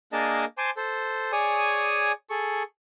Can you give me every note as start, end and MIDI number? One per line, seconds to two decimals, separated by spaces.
0.13 0.45 58
0.13 0.45 62
0.13 0.45 68
0.13 0.45 70
0.13 0.45 75
0.13 0.45 81
0.58 0.70 72
0.58 0.70 80
0.58 0.70 81
0.58 0.70 84
0.58 0.70 86
0.77 1.32 69
0.77 1.32 72
1.32 2.12 68
1.32 2.12 73
1.32 2.12 74
1.32 2.12 80
1.32 2.12 85
1.32 2.12 87
2.30 2.63 68
2.30 2.63 69
2.30 2.63 85